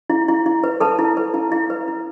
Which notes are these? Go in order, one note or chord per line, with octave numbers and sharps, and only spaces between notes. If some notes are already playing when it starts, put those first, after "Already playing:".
E4
E4
E4
B4
A4 B4 A5
E4
B4
E4
E4
B4
E4